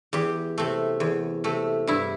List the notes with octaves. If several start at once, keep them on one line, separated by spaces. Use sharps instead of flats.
E2 G4
C3 A3
E2
C3 A3
G2 E4